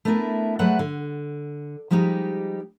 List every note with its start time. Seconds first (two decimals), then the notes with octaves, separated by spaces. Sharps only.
0.05 A3 B3 D4 E4 A#4
0.59 F#3 G#3 A3 B4 E5 F#5
0.79 D3
1.91 F3 G3 G#3 D#4 G4